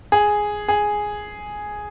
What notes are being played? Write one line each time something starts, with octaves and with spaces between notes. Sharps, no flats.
G#4
G#4